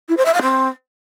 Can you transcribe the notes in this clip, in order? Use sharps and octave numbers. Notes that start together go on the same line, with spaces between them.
E4
C5
E5
F5
C4